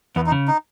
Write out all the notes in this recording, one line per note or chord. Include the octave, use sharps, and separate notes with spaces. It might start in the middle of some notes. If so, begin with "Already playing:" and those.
E2 B3
D#4
C#3
D#4